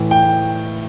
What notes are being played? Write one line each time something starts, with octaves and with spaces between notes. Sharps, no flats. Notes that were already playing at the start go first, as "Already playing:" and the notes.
Already playing: A2 E3
G5